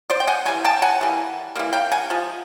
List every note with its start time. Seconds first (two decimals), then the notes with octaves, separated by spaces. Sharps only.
0.10 C5 D5
0.20 G5
0.27 F#5 G#5
0.45 E3 G3 G#5
0.64 G5 A5
0.82 F#5 G#5
1.01 E3 G3 A#3
1.55 E3 G3 A#3
1.73 F5 G5
1.92 F#5 G#5
2.10 F3 G#3